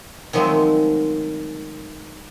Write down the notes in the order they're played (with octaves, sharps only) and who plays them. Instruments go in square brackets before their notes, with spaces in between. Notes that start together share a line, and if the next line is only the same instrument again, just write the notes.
[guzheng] D#3 F3 F#3 G#3 A3 C4